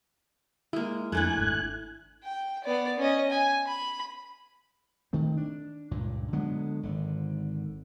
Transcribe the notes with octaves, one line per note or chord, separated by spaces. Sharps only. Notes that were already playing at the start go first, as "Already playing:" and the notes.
G#3 A#3 E4
F2 A3 D4 E4 G#5 F#6
G#1
G5
B3 D5
C#4 D#5
G#5
B5
D#3 A3 C4
D4
C#2 G2 A#2
D3 F#3 G#3 B3
G#1 D3